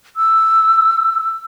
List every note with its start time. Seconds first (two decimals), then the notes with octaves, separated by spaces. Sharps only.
0.17 E6